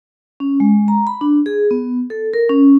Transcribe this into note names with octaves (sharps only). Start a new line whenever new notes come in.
C#4
G#3
A#5
B5
D4
G#4
B3
A4
A#4
C#4